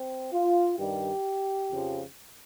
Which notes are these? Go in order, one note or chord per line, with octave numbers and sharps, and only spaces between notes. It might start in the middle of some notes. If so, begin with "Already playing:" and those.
Already playing: C4
F4
G2 D#3 G3 G4
F2 C#3 F3